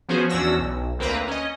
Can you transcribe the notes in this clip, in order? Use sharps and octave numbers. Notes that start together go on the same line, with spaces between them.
F3 B3 C#4 F#4 G#4 C5
E2 C#4 D4 F#4 E6 A#6
B1
D2 A#3 C4 B4 A#5
C#4 D#5